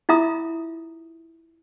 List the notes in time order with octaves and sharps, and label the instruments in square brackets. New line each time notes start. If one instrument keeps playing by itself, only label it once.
[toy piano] E4 F4 E5 A#5 D#6